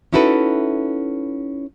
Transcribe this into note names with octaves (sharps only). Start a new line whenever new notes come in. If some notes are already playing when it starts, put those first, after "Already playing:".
C#4 D#4 E4 F#4 A4 B4